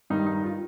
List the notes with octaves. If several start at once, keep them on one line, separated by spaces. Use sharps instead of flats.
G2 D#3 D#4
D#4
F4